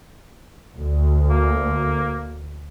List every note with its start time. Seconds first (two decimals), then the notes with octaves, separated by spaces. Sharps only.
0.76 D2
1.30 A#3